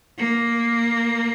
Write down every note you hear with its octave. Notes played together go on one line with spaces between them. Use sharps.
A#3